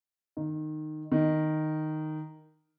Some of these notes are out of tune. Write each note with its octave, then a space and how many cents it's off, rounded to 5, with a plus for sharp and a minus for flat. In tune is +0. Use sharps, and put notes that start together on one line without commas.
D#3 -15
D#3 -5